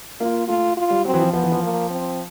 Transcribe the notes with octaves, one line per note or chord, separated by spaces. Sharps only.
A#3 F4
A3 F4
F4
G3
F#3 C4
E3
F3
F3 B3
E3
F3
A#3
C4